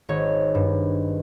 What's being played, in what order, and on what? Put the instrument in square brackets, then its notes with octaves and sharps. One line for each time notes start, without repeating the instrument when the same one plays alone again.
[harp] G#1 C#5
G2